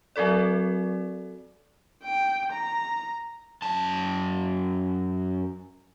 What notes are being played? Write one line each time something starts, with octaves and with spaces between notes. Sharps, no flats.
F#3 C4 F#4 A4 D5
G5
A#5
F#2 A5